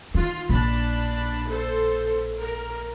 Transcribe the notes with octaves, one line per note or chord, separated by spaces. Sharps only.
D#3 F4
A#1 D4 A5 B5
A4 C5
A#4